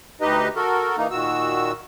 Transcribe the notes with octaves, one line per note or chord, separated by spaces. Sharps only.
D2 D#4 G4 B4 D#5
F#4 A4 A#4
E3 A#3 D#4
A#2 D#3 F#4 E6